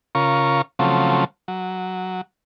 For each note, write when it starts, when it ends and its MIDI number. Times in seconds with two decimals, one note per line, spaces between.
0.15 0.62 49
0.15 0.62 65
0.15 0.62 70
0.15 0.62 85
0.79 1.24 49
0.79 1.24 53
0.79 1.24 54
0.79 1.24 57
0.79 1.24 60
1.48 2.21 54